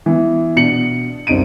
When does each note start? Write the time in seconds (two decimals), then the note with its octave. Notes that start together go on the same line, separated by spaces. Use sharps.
0.06 E3 B3
0.56 B2 D4 C#7 F#7
1.27 F#1 C2 D#4 D7 D#7